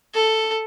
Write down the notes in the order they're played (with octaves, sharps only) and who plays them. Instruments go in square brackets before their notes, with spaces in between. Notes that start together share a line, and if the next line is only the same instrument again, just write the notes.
[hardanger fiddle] A4